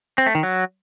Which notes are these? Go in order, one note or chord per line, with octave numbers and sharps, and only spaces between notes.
C4
A3
D#3
F#3